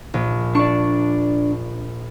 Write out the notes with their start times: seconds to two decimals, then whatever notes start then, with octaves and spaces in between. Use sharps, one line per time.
0.14 A#1
0.55 D4 D5 C#6